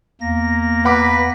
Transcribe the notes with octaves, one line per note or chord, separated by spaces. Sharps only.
E2 A#3 A#6
B4 F#5 B5 D6